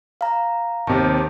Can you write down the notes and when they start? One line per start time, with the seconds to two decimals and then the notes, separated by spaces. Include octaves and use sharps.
0.21 F5 A#5
0.87 D#2 C3 D#3 A5